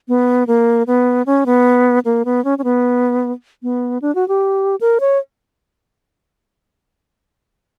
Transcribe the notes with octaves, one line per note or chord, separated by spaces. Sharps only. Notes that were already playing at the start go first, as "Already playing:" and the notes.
B3
A#3
B3
C#4
B3
A#3
B3
C#4
C#4
B3
B3
D4
F#4
G4
A#4
C#5